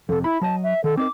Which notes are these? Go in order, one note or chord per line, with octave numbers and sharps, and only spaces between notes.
F2 C3 A4
E4 B5
F#3 C#5 D#5 A5
E5
D#3 A4
C4 D#4 A#4 D6